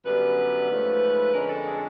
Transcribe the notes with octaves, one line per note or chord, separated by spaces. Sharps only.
F#2 D3 G3 B3 B4
G#2 F3 A3 C#4
F2 D3 F3 G#3 C#4 A#4
A4
G#4
A4